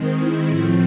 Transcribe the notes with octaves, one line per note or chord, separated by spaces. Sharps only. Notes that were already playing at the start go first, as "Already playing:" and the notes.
Already playing: D#3 G#3 C4
E4
A2 F3 A3 C4 E4